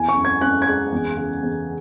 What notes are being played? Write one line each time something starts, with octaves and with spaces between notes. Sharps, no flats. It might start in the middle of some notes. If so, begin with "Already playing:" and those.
Already playing: E2 E3 G#5
C#6
F#2
G#6
F#2 F#6
G#6
G#3 F#6
E2
C#3
E2